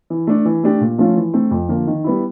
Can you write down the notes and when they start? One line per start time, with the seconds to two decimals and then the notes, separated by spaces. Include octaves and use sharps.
0.10 E3
0.27 A3 D4
0.45 E3
0.64 A3 D4 G4
0.81 A#2
0.98 F3 A3 C#4 F4
1.17 E3
1.33 A3 C4
1.51 F2
1.69 D3 F3 A#3
1.87 D#3
2.04 G3 B3 E4